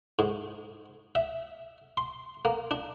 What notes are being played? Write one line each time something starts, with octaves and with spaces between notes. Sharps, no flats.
G#2
E5
C6
A#3
D4